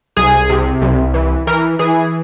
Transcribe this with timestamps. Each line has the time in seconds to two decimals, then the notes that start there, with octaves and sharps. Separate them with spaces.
0.17 C2 G#4
0.50 C3
0.82 C2
1.14 E3
1.47 E3 A#4
1.79 E3 G#4